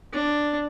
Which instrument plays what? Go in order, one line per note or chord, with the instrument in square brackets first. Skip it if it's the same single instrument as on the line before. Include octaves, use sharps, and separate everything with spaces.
[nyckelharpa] D4